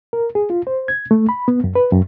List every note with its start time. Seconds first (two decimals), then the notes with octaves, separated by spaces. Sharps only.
0.13 A#4
0.35 G#4
0.50 F4
0.67 C5
0.88 G#6
1.11 A3
1.29 B5
1.48 B3
1.64 F#2
1.75 B4
1.92 F#2